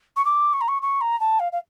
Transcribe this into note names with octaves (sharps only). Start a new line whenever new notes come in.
C#6
D6
C#6
A#5
C#6
C#6
A#5
A5
F5
F5